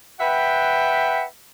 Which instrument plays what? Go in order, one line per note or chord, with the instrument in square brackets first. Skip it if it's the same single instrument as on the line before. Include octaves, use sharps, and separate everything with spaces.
[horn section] B4 E5 F#5 G5